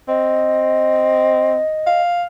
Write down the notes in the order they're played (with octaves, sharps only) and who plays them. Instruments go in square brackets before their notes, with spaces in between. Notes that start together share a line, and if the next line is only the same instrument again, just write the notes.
[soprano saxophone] C4 [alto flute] D#5
[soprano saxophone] F5